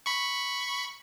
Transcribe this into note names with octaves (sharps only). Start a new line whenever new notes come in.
B5 C#6